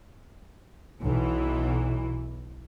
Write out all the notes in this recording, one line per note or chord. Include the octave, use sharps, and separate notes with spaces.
B1 E3